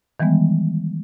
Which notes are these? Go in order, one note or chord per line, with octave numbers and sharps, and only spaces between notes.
D#3 E3 G3 G#3 B3